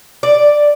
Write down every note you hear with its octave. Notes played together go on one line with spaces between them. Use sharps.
D5